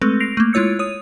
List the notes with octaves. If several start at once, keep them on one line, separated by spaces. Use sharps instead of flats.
G#3 A3 C4 A4 B4
A#6 C7 D7 F7
A3 A#3
G#3 E4 F4 C#5 E6 C#7
C#5 D#6 D#7